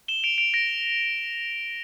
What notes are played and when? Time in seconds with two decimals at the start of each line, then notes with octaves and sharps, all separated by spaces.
0.08 E7 G7
0.24 D7 F7
0.38 D7 F7
0.54 A#6 D7